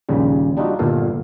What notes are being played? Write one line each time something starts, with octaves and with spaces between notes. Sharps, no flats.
A#1 D#2 C#3 G3
G3 D4 D#4 F4 F#4
G1 G2 A#2 A4 F5